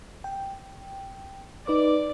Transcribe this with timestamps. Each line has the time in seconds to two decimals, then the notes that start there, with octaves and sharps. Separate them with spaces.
0.24 G5
1.67 D#4 B4 D5 D6